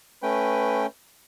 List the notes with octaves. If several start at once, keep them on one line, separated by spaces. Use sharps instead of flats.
A3 C#4 B4 G5